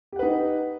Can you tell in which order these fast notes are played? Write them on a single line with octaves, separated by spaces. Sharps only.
G4 F#5 B4 D#4